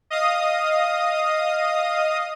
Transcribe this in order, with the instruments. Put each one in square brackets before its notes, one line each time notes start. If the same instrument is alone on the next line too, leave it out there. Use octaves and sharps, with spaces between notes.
[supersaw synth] D#5 F5 D#6